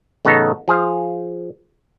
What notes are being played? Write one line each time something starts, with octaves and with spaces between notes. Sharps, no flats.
A1 C#3 B3 D#4 A4 C#5
F3 G#4 C5 F5